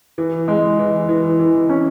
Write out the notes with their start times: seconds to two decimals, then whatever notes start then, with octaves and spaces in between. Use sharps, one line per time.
0.18 E3
0.48 G#3
0.79 E3
1.09 E3
1.39 E3
1.69 C#4